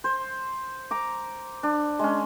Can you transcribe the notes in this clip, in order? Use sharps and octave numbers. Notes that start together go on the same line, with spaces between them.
C5
A#5 D6
D4
G#3 C#4